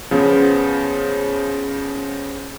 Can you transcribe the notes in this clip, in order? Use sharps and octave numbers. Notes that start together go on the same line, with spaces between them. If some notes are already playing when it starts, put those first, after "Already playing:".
C#3 F3 B3